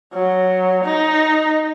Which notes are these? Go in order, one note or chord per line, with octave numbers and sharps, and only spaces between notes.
F#3
D#4